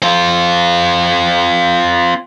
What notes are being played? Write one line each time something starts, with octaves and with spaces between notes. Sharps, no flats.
C4 F4